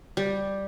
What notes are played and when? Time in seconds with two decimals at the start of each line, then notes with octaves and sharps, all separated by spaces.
0.17 G3